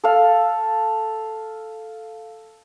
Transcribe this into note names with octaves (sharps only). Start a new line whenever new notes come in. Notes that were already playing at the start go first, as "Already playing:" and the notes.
A4 F5